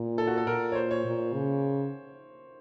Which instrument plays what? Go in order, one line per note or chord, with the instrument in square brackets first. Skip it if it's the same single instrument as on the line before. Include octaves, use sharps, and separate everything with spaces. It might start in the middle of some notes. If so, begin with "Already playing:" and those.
Already playing: [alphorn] A#2
[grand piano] A4
F#4
A4
[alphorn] A#2 [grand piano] A#4
[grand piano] C#5
C5
C#5
[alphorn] A#2
C#3